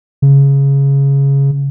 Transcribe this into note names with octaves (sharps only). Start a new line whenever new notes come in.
C#3